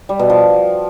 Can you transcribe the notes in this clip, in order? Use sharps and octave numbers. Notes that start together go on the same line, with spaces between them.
G3
B2
F3